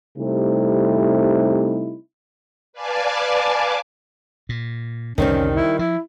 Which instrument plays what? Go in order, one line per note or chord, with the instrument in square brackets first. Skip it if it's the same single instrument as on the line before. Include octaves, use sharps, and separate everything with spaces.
[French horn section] C3 G3 A3 C4 D#4 E4
[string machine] B4 D5 F5 G#5 A5 D6
[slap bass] A#2
[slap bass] C2 F2 D3 [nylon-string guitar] D#3 G3 C4 [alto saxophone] C#4
[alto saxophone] E4
[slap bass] F3 [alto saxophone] E4